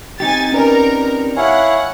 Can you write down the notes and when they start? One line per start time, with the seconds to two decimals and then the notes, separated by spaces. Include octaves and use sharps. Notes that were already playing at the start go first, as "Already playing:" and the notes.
0.20 C4 D#4 G4 G#5 A6
0.53 C#4 A#4 B4 D5
1.37 E4 C#5 F5 F#5 G#5